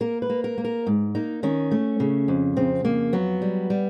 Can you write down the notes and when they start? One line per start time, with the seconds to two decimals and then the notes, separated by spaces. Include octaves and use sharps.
0.01 A#3 A#4
0.22 B4
0.30 A#3
0.44 A#4
0.58 A#3
0.64 A#4
0.87 G#2
1.15 A#3 D#4
1.43 D#3 C#4
1.71 A3
2.00 C#3
2.28 F2
2.57 C#3 C4
2.84 F2 A#3
3.13 F#3 B3
3.42 G3
3.70 G3